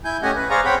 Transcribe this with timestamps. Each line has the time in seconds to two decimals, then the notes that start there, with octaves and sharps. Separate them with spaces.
0.05 E4 G#5 G6
0.22 A3 C#4 G4 D#5 F#5 G#5
0.36 B4
0.50 G#4 C5 D5 F5 A#5 C#6
0.65 C4 C#5 F#5 G5 B5